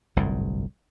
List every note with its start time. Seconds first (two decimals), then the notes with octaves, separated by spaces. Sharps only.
0.16 G1 C2 F#2 A2